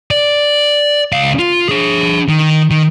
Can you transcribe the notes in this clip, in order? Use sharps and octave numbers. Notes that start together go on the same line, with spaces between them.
D5
C#2 F5
F4
D4 G#4
D#3
D#3